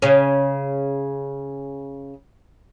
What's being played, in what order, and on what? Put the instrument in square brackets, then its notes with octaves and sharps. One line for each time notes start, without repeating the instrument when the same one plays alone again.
[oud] C#3 C#4